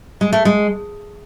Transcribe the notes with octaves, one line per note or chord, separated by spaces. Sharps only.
G#3
A3
G#3